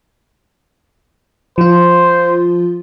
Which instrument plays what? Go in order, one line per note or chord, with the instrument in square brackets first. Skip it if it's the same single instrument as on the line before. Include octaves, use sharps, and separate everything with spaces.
[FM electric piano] F3 F4 [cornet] C5